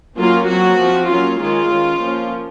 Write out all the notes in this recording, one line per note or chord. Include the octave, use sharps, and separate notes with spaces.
F#3 A#3 C#4 F4
F#3 C4 F#4
F3 C4
F#3 A#3 C#4 F4
D#3 G#3 C#4 F4
D#3 G#3 C#4
F3 A#3 C#4